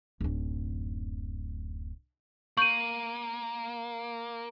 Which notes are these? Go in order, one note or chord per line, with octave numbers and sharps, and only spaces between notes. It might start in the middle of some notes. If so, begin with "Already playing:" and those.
D1 F#2
A#3 C#6 G6 D#7 F#7